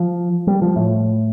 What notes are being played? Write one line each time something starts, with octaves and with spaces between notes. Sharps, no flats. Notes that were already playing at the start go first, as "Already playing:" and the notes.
Already playing: F3
G3
F3
A2